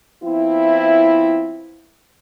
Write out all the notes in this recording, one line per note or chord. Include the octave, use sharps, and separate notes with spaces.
F3 B3 C4 E4